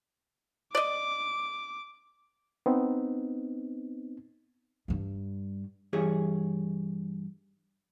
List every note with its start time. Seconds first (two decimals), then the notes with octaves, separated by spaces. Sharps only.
0.75 D5 D#5 D6
2.66 B3 C4 D#4
4.88 G2 G3
5.93 G2 E3 G4 G#4 C#5